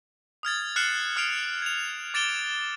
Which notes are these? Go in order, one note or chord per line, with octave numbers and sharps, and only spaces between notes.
D#6 F6 G#6 A6
F6 F#6 C7 C#7 E7 F#7
D#6 F6 C7 D7 F7
G#6 F7
D6 A6 D7 E7 G7